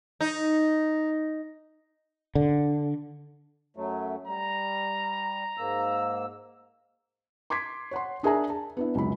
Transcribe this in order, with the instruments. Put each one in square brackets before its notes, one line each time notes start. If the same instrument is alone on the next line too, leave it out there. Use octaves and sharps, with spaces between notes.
[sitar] D#4
[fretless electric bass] D3
[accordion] F#2 F#3 A3
[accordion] G3 [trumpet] A#5
[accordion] G#2 A#3 E6
[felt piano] C6 D6 G#6 B6
C#5 F#5 C6
D4 G#4 A#4 E5 G#5 A#5
A5
B3 D4 E4
C#2 F#2 B5